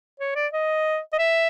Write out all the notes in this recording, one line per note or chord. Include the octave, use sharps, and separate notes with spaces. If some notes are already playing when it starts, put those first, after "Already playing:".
C#5
D5
D#5
D#5
E5